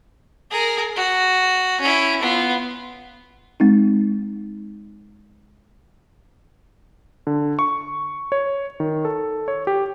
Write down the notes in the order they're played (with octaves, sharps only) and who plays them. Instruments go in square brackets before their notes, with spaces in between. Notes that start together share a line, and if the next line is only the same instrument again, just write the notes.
[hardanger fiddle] G#4 A#4
F#4
C#4 E4
B3 F4
[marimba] G#3 C4 D#4
[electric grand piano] D3
C#6
C#5
D#3
A4
C#5
G4